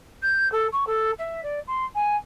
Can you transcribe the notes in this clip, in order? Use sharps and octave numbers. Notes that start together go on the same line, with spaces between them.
G6
A4
C#6
A4
E5
D5
C6
G#5